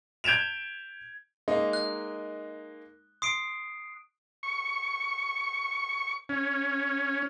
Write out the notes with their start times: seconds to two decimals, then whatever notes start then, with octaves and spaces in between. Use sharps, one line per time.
0.24 G6 G#6 D7 E7 F7
1.48 G#3 A#3 D#4
1.73 F#6
3.22 C6 D#6 C7 D7
4.43 C#6
6.29 C#4